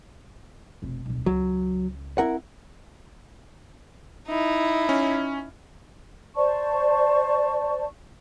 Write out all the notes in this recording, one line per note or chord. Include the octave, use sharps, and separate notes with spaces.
F1 B2
D1 B1
C#2 F#3
C4 E4 A#4 F#5
D#4 E4
C#4
C5 D5 A5 C#6